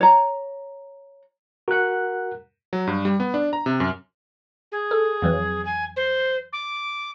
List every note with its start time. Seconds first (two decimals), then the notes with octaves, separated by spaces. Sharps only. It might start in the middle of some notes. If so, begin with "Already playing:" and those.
0.01 C#5 A#5
1.68 F#4 A#4 F#5 F#6
2.73 F#3
2.87 G2
3.05 G3
3.20 B3
3.34 D4
3.53 A#5
3.66 C3
3.80 F#2
4.72 G#4
4.91 A4
5.22 F2 E3 F#3
5.65 G#5
5.96 C5
6.53 D6